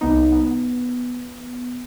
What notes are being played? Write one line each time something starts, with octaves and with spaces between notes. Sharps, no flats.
C2 B3 D#4
B3